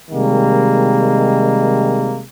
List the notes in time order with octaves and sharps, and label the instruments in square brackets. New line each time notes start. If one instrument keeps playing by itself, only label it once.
[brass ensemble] C3 D#3 G3 G#3 A#3